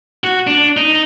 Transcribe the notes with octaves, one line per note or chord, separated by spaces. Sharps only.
F#4
D4
D#4